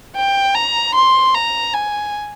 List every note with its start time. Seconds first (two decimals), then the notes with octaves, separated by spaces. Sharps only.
0.16 G5
0.55 A#5
0.95 C6
1.35 A#5
1.73 G#5